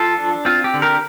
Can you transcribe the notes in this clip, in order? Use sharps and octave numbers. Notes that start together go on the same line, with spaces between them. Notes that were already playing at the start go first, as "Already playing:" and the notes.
Already playing: F3 F4 A4
D4
C4 F4
G4
D3
G4 A#4